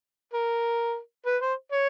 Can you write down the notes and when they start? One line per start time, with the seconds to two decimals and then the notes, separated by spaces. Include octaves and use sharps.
0.33 A#4
1.26 B4
1.42 C5
1.72 C#5